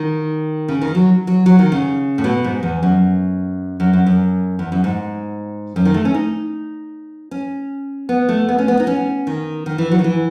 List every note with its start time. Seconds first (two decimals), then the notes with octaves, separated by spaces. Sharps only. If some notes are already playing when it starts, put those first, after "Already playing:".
Already playing: D#3
0.68 C#3
0.81 D#3
0.95 F#3
1.27 F#3
1.46 F#3
1.59 D#3
1.72 C#3
2.18 A2
2.24 B2
2.44 G#2
2.63 E2
2.83 F#2
3.80 F#2
3.93 F#2
4.06 F#2
4.59 E2
4.72 F#2
4.84 G#2
5.76 F#2
5.85 D#3
5.94 A3
6.05 C#4
6.14 D#4
7.31 C#4
8.09 B3
8.29 A3
8.49 B3
8.59 C#4
8.68 B3
8.80 D#4
8.87 C#4
9.27 D#3
9.66 D#3
9.78 E3
9.91 F#3
9.99 D#3
10.04 E3